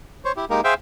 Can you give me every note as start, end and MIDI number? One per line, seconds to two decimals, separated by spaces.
0.25 0.32 72
0.25 0.32 73
0.37 0.45 64
0.37 0.45 67
0.50 0.61 56
0.50 0.61 58
0.50 0.61 63
0.50 0.61 67
0.50 0.61 70
0.64 0.74 68
0.64 0.74 72
0.64 0.74 76
0.64 0.74 77
0.64 0.74 79